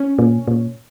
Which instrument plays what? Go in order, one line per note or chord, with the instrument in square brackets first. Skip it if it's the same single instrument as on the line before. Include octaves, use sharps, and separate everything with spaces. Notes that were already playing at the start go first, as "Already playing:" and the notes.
Already playing: [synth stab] C#4
[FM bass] A#2
A#2